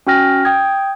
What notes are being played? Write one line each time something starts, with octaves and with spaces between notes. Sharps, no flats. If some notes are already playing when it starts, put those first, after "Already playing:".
C#4 F#4 G5 F6 A#6
G5 D#6 G#6